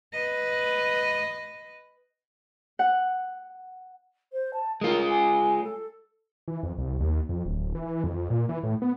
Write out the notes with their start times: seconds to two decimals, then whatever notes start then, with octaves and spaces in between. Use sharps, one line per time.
0.13 B4 D#5
2.79 F#5
4.32 C5
4.53 A5
4.81 G#3 F4 A#4
5.09 G#5
5.64 A4
6.48 E3
6.63 F2
6.78 C2
7.00 D#2
7.29 F2
7.46 D1
7.75 E3
8.04 F2
8.30 A#2
8.49 E3
8.63 A2
8.82 B3